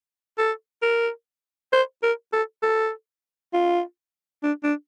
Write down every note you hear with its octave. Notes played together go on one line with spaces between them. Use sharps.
A4
A#4
C5
A#4
A4
A4
F4
D4
D4